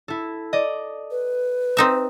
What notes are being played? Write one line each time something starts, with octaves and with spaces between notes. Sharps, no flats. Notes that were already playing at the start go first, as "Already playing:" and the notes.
E4 A4
D5 D#5
B4
C4 D#4 E5